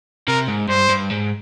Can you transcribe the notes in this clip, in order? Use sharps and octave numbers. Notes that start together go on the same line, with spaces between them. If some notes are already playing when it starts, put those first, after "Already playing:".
C3 A#4
G#2
G2 C5
G2
G#2